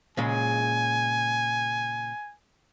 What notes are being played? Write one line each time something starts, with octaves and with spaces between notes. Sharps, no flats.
A#2 C#3 G#3 G#5